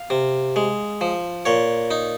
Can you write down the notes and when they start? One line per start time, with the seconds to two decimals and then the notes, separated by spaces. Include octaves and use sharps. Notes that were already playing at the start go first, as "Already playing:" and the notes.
Already playing: F5
0.10 C3
0.56 G#3
1.01 F3
1.45 A#2 C#5
1.91 D#4